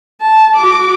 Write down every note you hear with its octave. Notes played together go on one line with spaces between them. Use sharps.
A5
F#4 D6